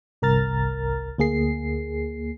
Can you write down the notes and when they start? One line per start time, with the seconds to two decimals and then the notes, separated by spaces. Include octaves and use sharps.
0.22 G1 C2 A#4 A#5 F6 A6
1.18 D2 A#3 G#4 C7